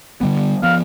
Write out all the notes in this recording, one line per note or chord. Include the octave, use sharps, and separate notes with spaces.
D3 G3 B3
F3 B3 F5